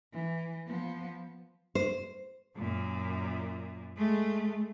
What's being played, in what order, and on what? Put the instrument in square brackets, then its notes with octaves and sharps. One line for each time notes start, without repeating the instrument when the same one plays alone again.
[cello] E3
F3 B3
[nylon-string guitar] C5
[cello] F#2 A#2
G#3 A3